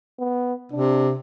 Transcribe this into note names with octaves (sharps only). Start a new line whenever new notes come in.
B3
C3 D4